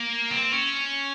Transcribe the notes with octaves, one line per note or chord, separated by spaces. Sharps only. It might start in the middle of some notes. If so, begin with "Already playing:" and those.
Already playing: A#3
C4
C#4